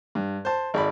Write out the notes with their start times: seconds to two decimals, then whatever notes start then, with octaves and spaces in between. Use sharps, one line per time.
0.15 G2
0.45 C5 A5
0.74 G#1 D5 B5